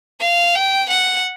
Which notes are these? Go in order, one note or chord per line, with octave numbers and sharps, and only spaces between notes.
F5
G5
F#5